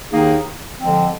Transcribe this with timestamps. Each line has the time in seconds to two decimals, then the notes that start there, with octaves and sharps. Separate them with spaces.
0.12 D#2 D#3 A#3 D#4 G#4
0.80 D3 F3 G#3 C4